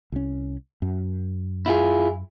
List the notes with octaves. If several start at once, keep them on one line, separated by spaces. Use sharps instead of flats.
C2 C#4
F#2
E4 F4 G#4